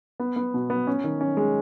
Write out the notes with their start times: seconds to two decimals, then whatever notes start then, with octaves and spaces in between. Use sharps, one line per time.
0.20 B3
0.36 B3
0.54 B2
0.70 B3
0.87 C#4
1.04 D#3
1.21 C#4
1.37 G#3